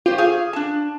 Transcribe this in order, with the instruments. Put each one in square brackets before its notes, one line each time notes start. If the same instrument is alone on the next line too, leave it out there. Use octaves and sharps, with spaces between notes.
[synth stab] F4 [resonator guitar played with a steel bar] G4 C5
[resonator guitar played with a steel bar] G#4 F5
D4 A5